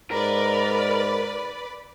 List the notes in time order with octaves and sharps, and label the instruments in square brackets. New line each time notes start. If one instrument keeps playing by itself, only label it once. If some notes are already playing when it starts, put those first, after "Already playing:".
[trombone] G#2 [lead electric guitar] A#4 [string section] B4 D5 B5